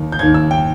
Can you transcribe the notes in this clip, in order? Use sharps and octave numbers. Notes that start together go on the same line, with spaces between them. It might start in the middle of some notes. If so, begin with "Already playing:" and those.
Already playing: D#2 D#3
G6
D#2 D#3 G#6
E6
G5